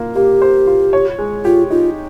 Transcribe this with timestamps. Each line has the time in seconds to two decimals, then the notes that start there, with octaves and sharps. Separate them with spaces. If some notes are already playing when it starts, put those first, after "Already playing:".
Already playing: A#3 F4
0.15 A#3 G4
0.42 C5
0.67 F4
0.93 C#5
1.19 G#3
1.45 F4 G4
1.70 D#4 F4